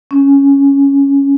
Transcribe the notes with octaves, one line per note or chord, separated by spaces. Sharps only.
C#4